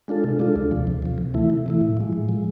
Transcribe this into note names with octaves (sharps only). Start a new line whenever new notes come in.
G#3 D4 F4 A4
C3
G#3 D4 F4 A4
D2
C3 F3
D2
C3 F3
C3
E3 A3 E4
C3
E3 A3 E4
A2
F3 G#3
A2
F3 G#3